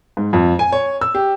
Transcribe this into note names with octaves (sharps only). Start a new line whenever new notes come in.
G#2
F2
G#5
C#5
E6
G4